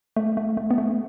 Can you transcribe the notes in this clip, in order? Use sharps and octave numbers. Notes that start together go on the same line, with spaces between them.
A3
A3
A3
B3
A3